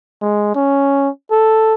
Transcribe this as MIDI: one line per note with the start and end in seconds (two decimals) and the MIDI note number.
0.22 0.52 56
0.55 1.09 61
1.31 1.75 69